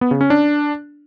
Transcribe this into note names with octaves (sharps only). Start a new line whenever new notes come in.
B3
C#3
C#4
D4